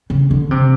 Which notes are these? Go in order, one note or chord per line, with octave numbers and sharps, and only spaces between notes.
C#3
D3
C3